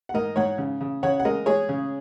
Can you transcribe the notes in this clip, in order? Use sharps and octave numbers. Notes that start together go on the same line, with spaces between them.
F#5
G#2 A#4 D#5
G#2 C#5 F#5
C#3
C#3
C#3 C#5 F#5
F#5
G#3 A#4 D#5
G#3 G#4 C#5
C#3